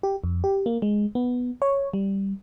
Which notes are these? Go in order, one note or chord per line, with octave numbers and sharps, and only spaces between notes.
G4
F2
G4
A#3
G#3
B3
C#5
G3